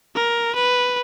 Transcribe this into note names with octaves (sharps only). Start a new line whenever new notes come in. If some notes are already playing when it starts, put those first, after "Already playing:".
A#4
B4